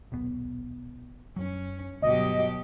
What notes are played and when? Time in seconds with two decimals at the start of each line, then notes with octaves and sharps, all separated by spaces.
0.12 D#1 B1 B3
1.36 F#2 F#3 C#4
2.02 D2 G2 B2 F#3 G4 D#5